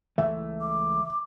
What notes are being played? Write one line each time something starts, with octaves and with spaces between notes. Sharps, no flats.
C#2 E3 A3 E5
D6